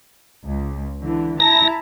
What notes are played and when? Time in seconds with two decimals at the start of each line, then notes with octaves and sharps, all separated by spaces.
0.44 C#2
1.02 D3 E3
1.40 E4 A5 A#5 A#6